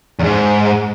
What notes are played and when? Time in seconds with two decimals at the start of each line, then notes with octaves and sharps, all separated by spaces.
0.19 E2 G#2